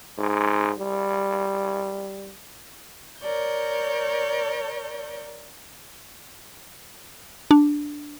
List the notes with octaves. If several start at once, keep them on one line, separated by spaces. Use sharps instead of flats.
G#2
G3
A#4 C#5 D5 G6
D4